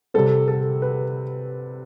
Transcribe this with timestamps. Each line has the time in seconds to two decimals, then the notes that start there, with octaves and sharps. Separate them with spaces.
0.14 C3 G3 C4 A4
0.48 A4
0.82 B4